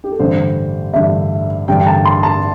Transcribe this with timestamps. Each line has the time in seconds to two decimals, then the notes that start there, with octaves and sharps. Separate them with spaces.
0.04 G4
0.12 A4
0.19 A1 G2 D3 G3 C5
0.93 A1 G2 D3 G3 E5
1.68 A1 G2 D3 G3 G5
1.80 G5
1.86 A5
2.05 C6
2.23 A5